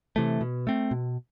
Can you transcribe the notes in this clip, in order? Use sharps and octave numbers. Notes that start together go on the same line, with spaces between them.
C3 E3 A3
B2
A3 C4
B2